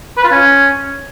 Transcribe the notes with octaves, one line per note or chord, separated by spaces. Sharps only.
B4
F4
C#4